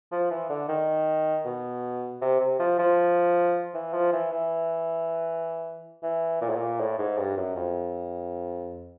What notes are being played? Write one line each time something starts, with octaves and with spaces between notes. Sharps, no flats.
F3
E3
D3
D#3
B2
C3
C3
F3
F3
E3
F3
E3
E3
E3
A#2
A2
A#2
A2
G#2
G2
F#2
F2